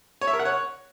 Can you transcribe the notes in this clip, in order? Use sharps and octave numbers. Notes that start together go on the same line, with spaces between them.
C#5
E5
A#4
F#5
C#5